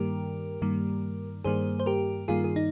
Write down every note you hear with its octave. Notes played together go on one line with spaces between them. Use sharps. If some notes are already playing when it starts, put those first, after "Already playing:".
Already playing: G2 D#3 G3 A#3 G4 A#4
G2 D#3 G3 A#3
G2 D#3 G3 A#3 G#4 C5
C5
G4 A#4
G2 D#3 G3 A#3 F4 G#4
G#4
D#4